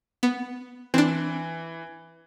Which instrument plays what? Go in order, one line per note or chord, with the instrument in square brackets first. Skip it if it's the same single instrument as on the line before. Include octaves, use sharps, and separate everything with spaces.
[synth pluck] B3
[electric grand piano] E3 [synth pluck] C4 D4